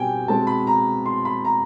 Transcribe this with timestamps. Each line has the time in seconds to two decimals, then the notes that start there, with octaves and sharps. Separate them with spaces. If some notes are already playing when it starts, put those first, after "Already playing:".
Already playing: B2 G3 C4 G5 G#5
0.27 B2 G#3 C4 A5
0.47 B5
0.67 A#5
1.06 C6
1.25 B5
1.45 A#5